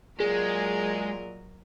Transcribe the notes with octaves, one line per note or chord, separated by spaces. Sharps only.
A#2 F#3 G#3 G#4 A#4 D#5